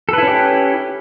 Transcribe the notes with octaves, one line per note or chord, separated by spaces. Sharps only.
C#4 E4 G4 A4 B4